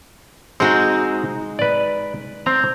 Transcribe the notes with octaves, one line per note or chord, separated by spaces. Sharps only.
G#3 C4 D#4 F#4
B4 D5
C4 A#5